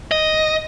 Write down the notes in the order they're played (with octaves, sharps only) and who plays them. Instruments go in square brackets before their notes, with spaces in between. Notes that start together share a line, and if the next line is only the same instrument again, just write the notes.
[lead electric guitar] D#5